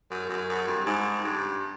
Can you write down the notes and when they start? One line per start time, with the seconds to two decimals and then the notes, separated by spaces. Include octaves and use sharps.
0.11 F#2
0.29 F#2
0.49 F#2
0.67 G2
0.86 G#2
1.24 G2